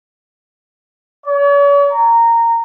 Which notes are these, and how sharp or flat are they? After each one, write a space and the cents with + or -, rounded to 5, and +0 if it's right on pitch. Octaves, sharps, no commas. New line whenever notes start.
C#5 +45
A#5 -15